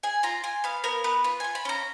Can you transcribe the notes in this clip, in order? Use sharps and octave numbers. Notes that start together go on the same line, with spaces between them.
G#4 G#5
F4 A#5
F4 G#5
B3 F5
B3 A#4
B3 B4
F4 B4
F4 G#5
B5
C#4 A#5